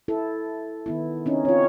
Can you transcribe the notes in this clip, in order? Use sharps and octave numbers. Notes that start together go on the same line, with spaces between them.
E4 A4
D#3 B3 E4
C4 C#4 D#4
C4 F4 C#5